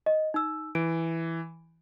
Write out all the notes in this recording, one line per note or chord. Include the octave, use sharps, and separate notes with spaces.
D#5
D#4 E6
E3 D7